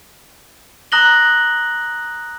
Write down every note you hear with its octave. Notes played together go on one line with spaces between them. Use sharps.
A#5 D#6 F#6 A#6 F#7 G7